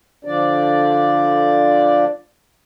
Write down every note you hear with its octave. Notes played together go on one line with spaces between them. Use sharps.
D3 F3 D4 D5